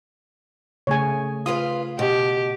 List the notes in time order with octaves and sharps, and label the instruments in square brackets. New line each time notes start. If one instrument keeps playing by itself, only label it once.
[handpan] C#3 A3 G#4 [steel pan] C#5 G#5
[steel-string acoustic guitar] F4 B4 F5 [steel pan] D#6
[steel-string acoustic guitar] B2 [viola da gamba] G4